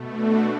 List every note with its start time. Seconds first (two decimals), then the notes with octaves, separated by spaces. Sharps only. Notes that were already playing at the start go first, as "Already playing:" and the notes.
Already playing: B2 A3
0.12 D4 F#4